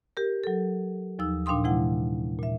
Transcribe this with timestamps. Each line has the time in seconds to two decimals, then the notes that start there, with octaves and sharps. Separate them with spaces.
0.17 G4 A#4
0.44 F#3 A4
1.19 D#2 F3 D#4 E6
1.46 A#2 D4 F5 G5 C6 D#6
1.64 C3 E3 G#3 E4 F#5
2.39 A#2 E5